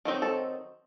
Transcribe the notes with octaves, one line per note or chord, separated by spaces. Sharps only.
D#3 F#3 C4 D#4
A4